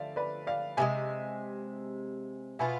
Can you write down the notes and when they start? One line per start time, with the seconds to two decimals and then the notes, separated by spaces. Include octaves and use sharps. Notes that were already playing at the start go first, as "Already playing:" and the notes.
Already playing: D3 F3 A3 D5 E5 F5
0.16 B4 D5
0.47 D5 F5
0.77 C3 E3 G#3 E5 G#5
2.59 B2 B3 F4 E5 G#5